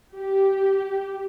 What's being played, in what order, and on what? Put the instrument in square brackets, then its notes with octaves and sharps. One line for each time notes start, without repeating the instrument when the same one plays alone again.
[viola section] G4